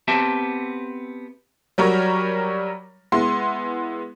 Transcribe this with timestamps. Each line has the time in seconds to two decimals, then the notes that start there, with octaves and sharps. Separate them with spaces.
0.08 B3 C4 G4 E5 A5
1.78 F#3 G3 A#4 C#5
3.12 G#3 B3 E4 C6